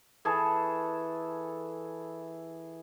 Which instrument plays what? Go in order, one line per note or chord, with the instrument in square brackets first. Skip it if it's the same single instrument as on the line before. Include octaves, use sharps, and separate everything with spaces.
[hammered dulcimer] E3 G#4 A4 A5